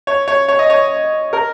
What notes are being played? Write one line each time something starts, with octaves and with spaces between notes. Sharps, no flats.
C#5
C#5
C#5
D#5
C#5
A#4